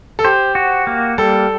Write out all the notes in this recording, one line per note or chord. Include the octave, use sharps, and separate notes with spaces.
A4
G4 C5
F#4
A#3
G3 A4